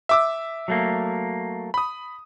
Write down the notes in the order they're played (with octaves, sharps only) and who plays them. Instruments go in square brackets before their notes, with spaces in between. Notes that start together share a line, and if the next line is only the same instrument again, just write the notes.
[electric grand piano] E5 D6 E6
[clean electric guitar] F#3 A3 A#3
[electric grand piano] B5 D#6